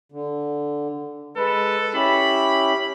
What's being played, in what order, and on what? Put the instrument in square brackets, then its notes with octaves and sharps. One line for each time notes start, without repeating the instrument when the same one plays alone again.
[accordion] D3
[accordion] G#3 B4 [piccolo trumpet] A4
[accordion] C#4 E4 G4 [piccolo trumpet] B5